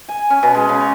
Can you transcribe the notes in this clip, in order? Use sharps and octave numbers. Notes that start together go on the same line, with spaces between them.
G#5
C#4
B2
G#3
C#3
C#5